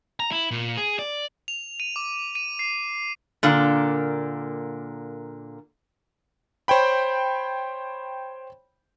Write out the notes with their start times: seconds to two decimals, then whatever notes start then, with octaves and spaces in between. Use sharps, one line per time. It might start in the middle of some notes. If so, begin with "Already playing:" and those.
0.20 A#5
0.32 E4
0.51 A#2
0.77 G#4
0.99 D5
1.48 F7
1.80 D#7
1.96 D6
2.35 D#7
2.59 C7
3.43 A#2 D3 A#3
6.68 C5 C#5 G5 B5